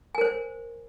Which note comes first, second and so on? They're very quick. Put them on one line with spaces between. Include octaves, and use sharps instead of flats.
G#5 A#4 C5